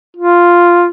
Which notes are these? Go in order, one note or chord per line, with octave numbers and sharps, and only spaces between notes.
F4